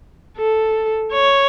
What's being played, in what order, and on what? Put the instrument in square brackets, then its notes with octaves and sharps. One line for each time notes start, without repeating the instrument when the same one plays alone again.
[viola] A4
C#5